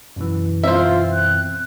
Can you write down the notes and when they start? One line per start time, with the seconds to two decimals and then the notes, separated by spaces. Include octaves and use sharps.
0.16 F#2 B2 E3
0.63 C4 F4 C5 E5
1.13 F#6